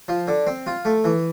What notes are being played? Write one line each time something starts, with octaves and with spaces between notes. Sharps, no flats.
F3
D3
C4
F4
A3
E3